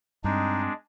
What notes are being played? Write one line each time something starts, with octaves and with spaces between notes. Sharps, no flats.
G2 G#3 C4 D4 D#4